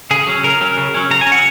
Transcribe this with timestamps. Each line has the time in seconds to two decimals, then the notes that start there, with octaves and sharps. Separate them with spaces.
0.11 C#3 G#4
0.27 F#3 C#4
0.43 C#3 A#4
0.61 F#3 C#4
0.77 C#3
0.94 F#3 C#4
1.10 C#3 A#5
1.21 G#5
1.27 C#4
1.32 F#3 F#5